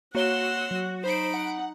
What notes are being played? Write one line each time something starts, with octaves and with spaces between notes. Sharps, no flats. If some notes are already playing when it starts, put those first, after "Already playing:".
A#3 F#4 C#5 F#5 C6 E6 G7
F#3
D#4 C5 B5 D7
F#5